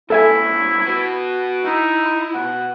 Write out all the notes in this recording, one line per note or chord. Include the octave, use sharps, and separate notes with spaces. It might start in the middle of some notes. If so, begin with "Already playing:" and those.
E2 G3 E4 A4 E5 G#5
F#4 B4
D#4 E4
B2 F#5